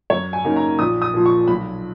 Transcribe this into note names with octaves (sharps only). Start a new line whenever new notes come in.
F#2 C#5
G#5
C#3 F#3 A#3 D#4
A#5
A#1 D#6
D#6
A#2 F3
C#6
B1 B5